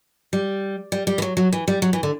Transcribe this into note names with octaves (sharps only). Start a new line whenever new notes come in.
G3
G3
G3
E3
F#3
F#3
E3
G3
F#3
E3
D3